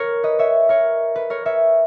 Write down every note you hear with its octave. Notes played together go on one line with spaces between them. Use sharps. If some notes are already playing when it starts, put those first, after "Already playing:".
Already playing: A#4 C#5
B4 D#5
C#5 E5
A#4 C#5
B4
A#4 C#5
C#5 E5